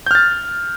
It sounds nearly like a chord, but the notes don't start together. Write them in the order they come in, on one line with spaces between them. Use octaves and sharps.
G6 F6 A6